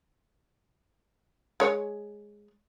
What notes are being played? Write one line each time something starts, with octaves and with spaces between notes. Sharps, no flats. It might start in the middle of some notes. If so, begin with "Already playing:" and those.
G#3 C#5